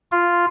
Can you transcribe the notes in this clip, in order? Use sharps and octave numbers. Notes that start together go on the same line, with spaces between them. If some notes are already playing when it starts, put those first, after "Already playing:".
F4